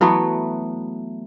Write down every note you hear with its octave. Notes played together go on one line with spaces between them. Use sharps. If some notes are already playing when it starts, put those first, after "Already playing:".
E3 F#3 A3 B3